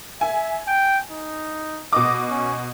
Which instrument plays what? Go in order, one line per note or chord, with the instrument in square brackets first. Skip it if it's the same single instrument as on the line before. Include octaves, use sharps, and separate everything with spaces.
[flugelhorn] E5 [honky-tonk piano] G#5
[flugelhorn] G5
D#4
[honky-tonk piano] B2 D6 [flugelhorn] D#5
[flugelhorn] C#4